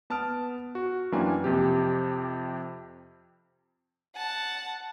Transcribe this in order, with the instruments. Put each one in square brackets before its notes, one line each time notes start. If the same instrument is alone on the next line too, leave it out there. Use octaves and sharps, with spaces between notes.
[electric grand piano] B3 A5 D#6 F6 D7
F#4
F#2 E3 A#3 D4 G5 G#5
F2 C3 G4
[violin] F#5 A5